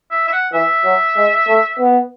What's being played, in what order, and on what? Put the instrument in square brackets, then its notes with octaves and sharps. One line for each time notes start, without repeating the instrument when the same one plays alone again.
[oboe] E5
E5
F#5
[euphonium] E3 [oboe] E5
[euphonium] F#3
G#3
A3
B3